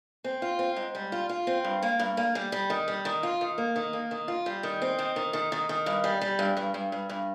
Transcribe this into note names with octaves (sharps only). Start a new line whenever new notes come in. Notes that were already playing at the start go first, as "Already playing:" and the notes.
C4
F4
C4
G#2
G3
F4
F4
C4
G2
A#3
G2
A#3
G3
G3
D#3
G3
D#3
F4
D#3
A#3
D#3
A#3
D#3
F4
G3
D#3
C4
D#3
D#3
D#3
D#3
D#3
G2
G3
G3
G2
G2
G2
G2
G2